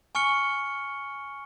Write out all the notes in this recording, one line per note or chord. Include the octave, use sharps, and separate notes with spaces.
G#5 C#6 F6 C#7 G7